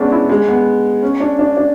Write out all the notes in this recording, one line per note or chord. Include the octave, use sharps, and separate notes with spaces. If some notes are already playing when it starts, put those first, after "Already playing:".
Already playing: G#3 B3 C#4 D4
E4
G#3
B3
C#4
D4
D4
D4